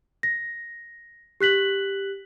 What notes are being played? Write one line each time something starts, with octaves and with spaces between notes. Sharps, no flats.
A#6
G4 F#6 B6 F#7